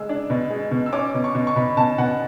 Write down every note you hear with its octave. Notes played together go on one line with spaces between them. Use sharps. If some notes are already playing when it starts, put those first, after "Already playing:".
Already playing: G#3 E6
D4
B2
G#3
B2
E6
C#4 D6
B2
C#6
B2
C#6
B2 B5
B2 A5
B2 F#5